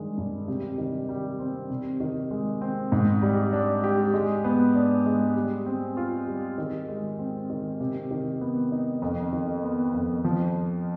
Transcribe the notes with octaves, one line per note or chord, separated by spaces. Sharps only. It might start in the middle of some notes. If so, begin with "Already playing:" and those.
Already playing: G2 D#3 G#3
G2
C3
D#3
G3
C4
C3
D#3
G#3
C4
G#2
G3
D4
G4
G#3
B3
D4
G#3
G3
C4
F4
G3
D#3
G#3
C4
D#3
C3
D#3
B3
D#4
F2
D#3
B3
F2
F3